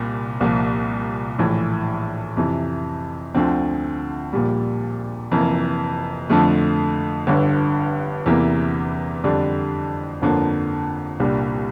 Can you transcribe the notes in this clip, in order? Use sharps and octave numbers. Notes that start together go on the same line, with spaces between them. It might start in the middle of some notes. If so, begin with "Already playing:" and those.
Already playing: C2 A#2
C2 A#2 F3
A#1 A2 E3
F2 C3 E3
D2 D3 F3 C4
A#1 A#2 G3
F1 F2 E3 A#3
F2 D3 F3 A3
G1 G2 D3
E2 C3 E3 A#3
F2 D3 G3 D4
G1 F2 D3 F3 A#3
C2 A#2 G3 D4